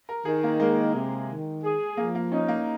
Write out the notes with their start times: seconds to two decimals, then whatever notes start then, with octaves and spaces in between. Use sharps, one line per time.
0.09 A#4
0.25 D#3 G#4
0.44 A#3
0.60 G#3 A#3
0.95 C3
1.29 D#3
1.63 G#4
1.97 F3 A#3
2.15 A#3
2.32 C#4 D#4
2.48 A#3